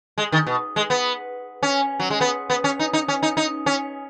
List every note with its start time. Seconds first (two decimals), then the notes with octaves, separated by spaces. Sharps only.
0.18 G#3
0.32 D#3
0.47 B2
0.76 G#3
0.90 B3
1.63 C#4
1.99 F#3
2.10 G#3
2.21 B3
2.50 B3
2.64 C#4
2.79 D#4
2.93 D#4
3.08 C#4
3.23 D#4
3.37 D#4
3.66 C#4